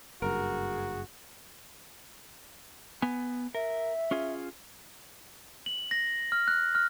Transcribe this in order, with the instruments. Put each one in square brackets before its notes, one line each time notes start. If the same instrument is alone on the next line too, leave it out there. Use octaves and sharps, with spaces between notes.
[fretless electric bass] F#1 G2 [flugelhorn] F#4 [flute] G#4 [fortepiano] A#4
[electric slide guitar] B3 G#5
[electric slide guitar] A#4 [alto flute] E5
[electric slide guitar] C#4 F4 G#4
[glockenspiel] F#7
A#6
F6
F#6
F6